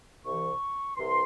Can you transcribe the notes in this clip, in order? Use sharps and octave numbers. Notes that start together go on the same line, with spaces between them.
C2 C3 E3 C#6
C2 C3 E3 C6